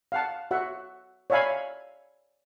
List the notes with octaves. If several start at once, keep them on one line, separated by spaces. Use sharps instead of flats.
F5 F#5 A5
F#4 E5 F#5
C#5 D5 E5 F5 G#5 B5